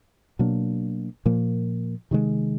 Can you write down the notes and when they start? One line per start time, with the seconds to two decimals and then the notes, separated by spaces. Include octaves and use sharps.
0.39 B2 F#3 A#3 D4
1.26 A#2 F3 A#3
2.11 C3 D#3 G#3